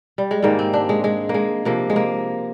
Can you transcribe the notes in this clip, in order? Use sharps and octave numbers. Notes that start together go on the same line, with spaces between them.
G3
G#3
G#2 D#3 G3 A#3
C4
D4
G#3
G#3
A#3
G#3
C3 F3 A#3
G#3
A#3